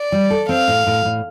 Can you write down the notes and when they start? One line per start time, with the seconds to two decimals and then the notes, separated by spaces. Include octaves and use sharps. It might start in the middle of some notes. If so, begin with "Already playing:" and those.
Already playing: D5
0.12 G3
0.31 A4
0.49 C4 F5
0.68 A2
0.87 A2
1.05 A2